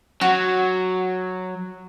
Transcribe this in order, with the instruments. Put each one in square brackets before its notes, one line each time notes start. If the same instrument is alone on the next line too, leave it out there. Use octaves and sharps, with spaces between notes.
[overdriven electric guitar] F#3 [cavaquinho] F#4